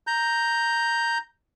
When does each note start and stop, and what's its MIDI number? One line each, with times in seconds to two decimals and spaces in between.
0.07 1.18 82
0.07 1.18 91